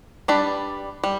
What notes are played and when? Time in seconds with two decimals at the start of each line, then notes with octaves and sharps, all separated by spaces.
0.28 G3 D4 B4 D5
1.03 G3